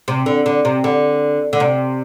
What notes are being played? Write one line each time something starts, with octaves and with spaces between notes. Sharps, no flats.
C3
D3
D3
C3
D3
D3
C3